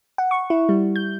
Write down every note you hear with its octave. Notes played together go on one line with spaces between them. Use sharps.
F#5
C#6
E4
G3
G6